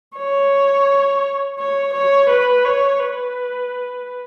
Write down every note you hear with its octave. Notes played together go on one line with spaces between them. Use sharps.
C#5
C#5
C#5
B4
C#5
B4